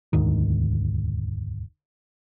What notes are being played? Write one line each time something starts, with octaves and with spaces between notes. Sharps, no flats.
E1 D2 G#2 D#3